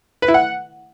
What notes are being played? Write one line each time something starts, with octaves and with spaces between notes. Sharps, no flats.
B4
E4
F#5